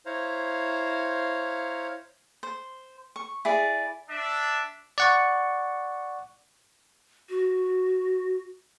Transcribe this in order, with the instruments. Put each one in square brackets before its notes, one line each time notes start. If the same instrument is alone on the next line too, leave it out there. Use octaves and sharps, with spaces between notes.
[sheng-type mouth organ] E4 C5 C#5 F5 A#5
[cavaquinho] C5
C#6
E4 G#4 D5
[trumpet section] D4 E5
[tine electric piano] D5 F#5 C#6
[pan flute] F#4